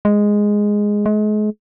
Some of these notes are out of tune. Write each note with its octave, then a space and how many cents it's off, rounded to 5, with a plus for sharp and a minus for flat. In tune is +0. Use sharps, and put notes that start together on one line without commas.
G#3 -5
G#3 +35